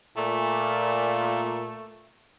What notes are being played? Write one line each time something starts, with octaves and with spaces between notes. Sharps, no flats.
A#2 A3